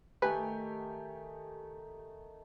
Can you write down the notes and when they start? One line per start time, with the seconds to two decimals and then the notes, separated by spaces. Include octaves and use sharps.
0.22 D#3 A3 G4 B4 G#5